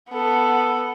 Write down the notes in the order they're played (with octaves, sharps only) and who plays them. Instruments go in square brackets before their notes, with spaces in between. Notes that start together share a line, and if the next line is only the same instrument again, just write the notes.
[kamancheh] B3 A4